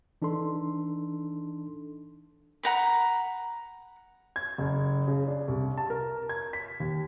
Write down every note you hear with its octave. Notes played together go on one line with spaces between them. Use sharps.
E3 D4 D#4 A4 C6
F#5 A#5 B5
G#6
F#1
C#3
D4
C2
A5
A#4
G#6
B6
D#2